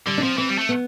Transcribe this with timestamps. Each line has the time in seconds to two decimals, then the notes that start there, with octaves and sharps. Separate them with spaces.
0.07 D3 G3
0.18 D4
0.23 F3 C4
0.38 E3 C4
0.49 G3
0.58 A3
0.69 B3